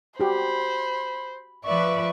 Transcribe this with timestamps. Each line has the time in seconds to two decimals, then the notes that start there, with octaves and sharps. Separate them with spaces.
0.20 F#4 G4 C5 B5
1.65 F3 B4 D5 E5 C#6